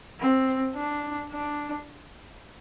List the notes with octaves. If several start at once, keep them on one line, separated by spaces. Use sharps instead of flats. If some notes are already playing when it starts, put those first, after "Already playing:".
C4
D4
D4